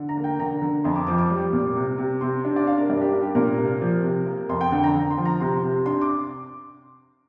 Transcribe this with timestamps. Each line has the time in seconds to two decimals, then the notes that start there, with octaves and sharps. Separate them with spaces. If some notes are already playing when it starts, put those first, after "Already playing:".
Already playing: D3
0.09 A#5
0.17 A#3
0.24 G5
0.39 D3 A#5
0.62 D3
0.84 F2 C6
0.96 D6
1.07 F3 D6
1.18 D6
1.30 G3
1.53 A#2
1.76 C3
1.98 C3
2.21 C3 C6
2.45 D4
2.56 D5
2.67 D4 F5
2.78 A#4
2.90 G2 D5
3.01 G4
3.12 D4 A#4
3.23 G4
3.35 A#2 A#4
3.58 C3
3.81 F3
4.04 C3
4.26 A#3
4.49 F2 C6
4.61 G5
4.72 D3 G5
4.84 A#5
4.95 D3
5.10 C6
5.18 F3
5.25 A#5
5.40 C3 C6
5.63 C3
5.86 D4 C6
6.01 D6